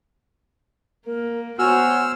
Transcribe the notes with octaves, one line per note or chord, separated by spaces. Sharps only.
A#3 A#4
B3 F#4 C5 C#5 G#5 E6 F6